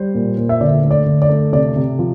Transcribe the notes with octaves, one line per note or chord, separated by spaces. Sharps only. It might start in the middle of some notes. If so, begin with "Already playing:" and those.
Already playing: G3 C5
A#2
A#2
E5
D3 D5
A3
D5
D3
D5
A3
C3 D5
C3
F3